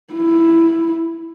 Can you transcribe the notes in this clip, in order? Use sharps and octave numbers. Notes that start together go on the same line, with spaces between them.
E4